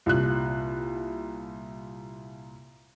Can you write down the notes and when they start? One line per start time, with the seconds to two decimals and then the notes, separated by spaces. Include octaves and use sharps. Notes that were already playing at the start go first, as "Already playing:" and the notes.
0.06 C2 A#2 F#6